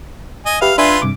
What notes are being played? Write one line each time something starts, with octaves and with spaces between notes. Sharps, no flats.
D#5 G#5
G4 B4 E5 F5
D4 F4 B4 E5 G#5 C6
G2 C3 D6